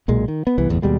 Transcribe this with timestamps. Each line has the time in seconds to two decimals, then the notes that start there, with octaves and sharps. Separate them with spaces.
0.08 B1 A#2 G#3
0.28 D#3
0.47 B3
0.58 C2 E3 B3
0.69 G1 E2 A2
0.82 D#2 B2 G3 G#3